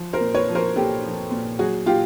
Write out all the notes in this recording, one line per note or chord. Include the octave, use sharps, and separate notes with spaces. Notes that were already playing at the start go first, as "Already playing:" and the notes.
Already playing: F3
A#4 C5
A#2
B4 C#5
F3
A#4 C5
A#2 G4 A4
F3
A#2
F#3 F#4 G#4
A#2 F4 G4